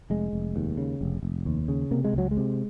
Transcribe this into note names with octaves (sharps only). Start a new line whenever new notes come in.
F1 G#3
F1
D#2
C#3
F1
F1
D#2
C#3
C3 A#3
G#3
C#2 F#3
G#3
C3